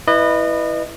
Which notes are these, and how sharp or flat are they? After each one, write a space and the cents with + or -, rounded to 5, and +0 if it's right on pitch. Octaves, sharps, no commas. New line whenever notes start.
E4 +0 B4 -5 D#5 -35